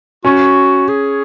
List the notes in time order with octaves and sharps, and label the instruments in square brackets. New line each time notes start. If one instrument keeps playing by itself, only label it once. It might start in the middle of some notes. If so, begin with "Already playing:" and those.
[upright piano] C#4 [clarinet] F#4
[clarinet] G#4